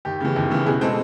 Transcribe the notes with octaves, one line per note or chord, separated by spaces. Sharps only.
D#2 G4
C#3 E3
D#2
C#3 E3
B2 G#4
G#3 C4 A4